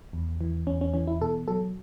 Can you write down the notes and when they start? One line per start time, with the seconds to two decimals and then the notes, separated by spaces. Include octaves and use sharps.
0.13 E2
0.41 E3
0.67 E2 C#4
0.81 C#4
0.94 E3 C#4
1.07 E4
1.21 B2 A4
1.48 F#3 A4